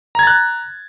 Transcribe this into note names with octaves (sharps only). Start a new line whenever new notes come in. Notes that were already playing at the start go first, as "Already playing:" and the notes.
A#5 F#6 G#6 A6